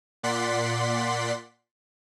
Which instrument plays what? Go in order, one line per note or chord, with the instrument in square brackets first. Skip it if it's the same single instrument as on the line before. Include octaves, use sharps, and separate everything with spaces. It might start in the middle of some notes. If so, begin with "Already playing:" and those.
[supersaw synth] A#2 D5 F#5 C6 B6